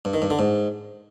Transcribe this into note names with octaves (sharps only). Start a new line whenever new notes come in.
G2
D#3
G2
D3
G#2